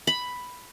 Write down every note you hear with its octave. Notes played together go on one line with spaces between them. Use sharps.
B5